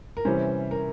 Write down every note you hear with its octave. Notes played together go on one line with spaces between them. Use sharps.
A#4
C3 E3 G3 C#4 C5
A#4